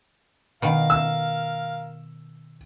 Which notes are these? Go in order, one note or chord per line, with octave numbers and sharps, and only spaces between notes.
B2 D#3 A#4 F5
E6